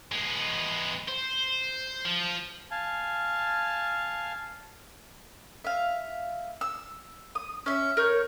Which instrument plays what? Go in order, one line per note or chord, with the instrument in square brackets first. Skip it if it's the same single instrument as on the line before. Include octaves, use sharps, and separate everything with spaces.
[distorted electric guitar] G#3 B3
C5
F3
[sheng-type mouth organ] F5 G#5 A5
[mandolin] E5 F5
E6
D#6
C#4 E5
A#4 C#5 G6